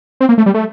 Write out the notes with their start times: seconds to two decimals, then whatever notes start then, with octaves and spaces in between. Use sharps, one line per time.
0.21 C4
0.29 A#3
0.38 A3
0.46 G3
0.54 A3